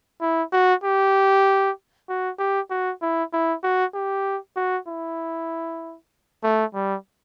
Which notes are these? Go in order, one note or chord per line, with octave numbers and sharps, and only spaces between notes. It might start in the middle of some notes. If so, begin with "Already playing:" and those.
E4
F#4
G4
F#4
G4
F#4
E4
E4
F#4
G4
F#4
E4
A3
G3